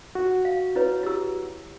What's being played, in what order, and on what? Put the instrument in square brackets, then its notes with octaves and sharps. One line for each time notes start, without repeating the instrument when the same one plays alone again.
[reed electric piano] F#4
[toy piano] F5
E4 B4 C#5
E4 G4 E6